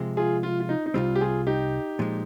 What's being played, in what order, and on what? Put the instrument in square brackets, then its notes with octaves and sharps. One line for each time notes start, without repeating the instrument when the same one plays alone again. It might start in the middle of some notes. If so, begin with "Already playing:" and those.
Already playing: [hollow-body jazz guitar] C3 F3 G#3
[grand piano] F4 G#4
F4
F4
D#4
D#4
[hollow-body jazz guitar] C2 C3 G3 C4 [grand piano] F4
[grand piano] G4
F4 G#4
D#4 G4
[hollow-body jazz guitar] A#2 F3 G#3